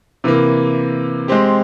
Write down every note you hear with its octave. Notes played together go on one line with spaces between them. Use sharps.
C3 E3 A#3
G#3 C4 G4